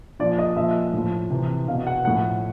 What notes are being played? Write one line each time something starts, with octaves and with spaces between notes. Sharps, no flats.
A#2 F3 D5
D#5
A#2 F3 E5
A2 F3
C3 E3
B2 F5
F#5
A2 F3 F#5